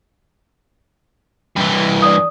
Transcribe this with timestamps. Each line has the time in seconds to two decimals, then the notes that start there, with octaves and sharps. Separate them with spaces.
1.56 G2 E3
2.02 D5 D#6